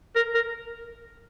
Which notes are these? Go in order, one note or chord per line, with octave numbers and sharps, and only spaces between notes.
A#4
A#4